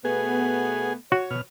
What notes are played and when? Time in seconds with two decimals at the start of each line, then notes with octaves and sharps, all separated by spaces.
0.05 B2 A3 B3 G#4
1.12 F#4 C#5
1.31 B2 F6